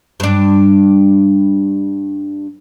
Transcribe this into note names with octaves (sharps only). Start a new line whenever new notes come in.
G2 D4